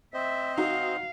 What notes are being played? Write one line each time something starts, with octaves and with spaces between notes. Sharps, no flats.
C4 C5 D#5 E5
D#4 F#4 F5